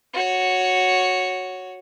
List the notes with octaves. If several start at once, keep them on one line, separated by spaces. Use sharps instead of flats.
F#4 C#5